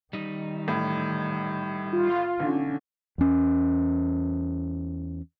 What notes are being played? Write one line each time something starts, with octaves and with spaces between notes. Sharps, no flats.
D#3 G3 D#4
A1 A2
F4
B1 D3 C#4
E2 C#4